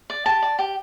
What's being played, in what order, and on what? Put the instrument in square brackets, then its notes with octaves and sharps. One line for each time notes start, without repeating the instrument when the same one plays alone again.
[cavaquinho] D5
G4 A5
D5
G4